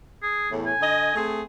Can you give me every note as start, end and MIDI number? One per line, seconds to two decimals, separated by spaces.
0.22 0.50 68
0.49 0.71 40
0.49 0.71 45
0.66 1.27 80
0.80 1.13 50
0.80 1.13 75
1.15 1.40 57
1.15 1.40 60
1.15 1.40 68